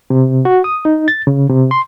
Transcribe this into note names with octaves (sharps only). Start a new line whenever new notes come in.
C3
F#4
D#6
D#4
A6
C#3
C3
C6